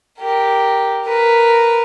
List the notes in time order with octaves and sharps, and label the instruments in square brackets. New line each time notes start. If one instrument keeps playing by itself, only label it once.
[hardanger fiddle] G4 A#4
A#4 B4